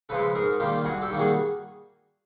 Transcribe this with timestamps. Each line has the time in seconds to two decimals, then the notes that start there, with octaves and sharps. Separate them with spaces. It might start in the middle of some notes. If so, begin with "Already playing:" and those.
0.09 C#3 F3 G#3 A4 B4
0.34 G#2 G#4 A#4
0.60 D#3 G3 A#3 F4 G4
0.84 G2 F#4 G#4
1.02 G4 A4
1.10 D#3 G3 A#3
1.18 F#4 G#4